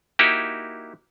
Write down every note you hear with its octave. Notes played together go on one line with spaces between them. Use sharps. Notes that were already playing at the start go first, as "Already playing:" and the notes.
A#3 D#4 E4 F#4 G4